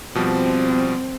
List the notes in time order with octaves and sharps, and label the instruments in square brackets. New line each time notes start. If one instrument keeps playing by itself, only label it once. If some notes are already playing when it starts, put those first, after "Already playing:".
[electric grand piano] B2 F3 G3 [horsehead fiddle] C4